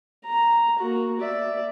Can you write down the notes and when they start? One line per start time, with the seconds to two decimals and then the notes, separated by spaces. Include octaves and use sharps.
0.25 A#5
0.79 A#3 F#4
1.20 D5 E5